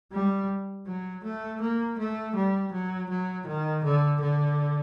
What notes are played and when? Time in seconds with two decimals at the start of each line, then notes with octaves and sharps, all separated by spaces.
0.12 G3
0.87 F#3
1.24 A3
1.61 A#3
1.98 A3
2.35 G3
2.72 F#3
3.10 F#3
3.47 D#3
3.84 D3
4.21 D3